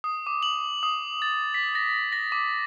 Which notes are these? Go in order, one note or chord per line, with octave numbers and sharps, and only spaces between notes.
D#6
D6
F#7
D#6
A6
B6
A#6
A#6
D6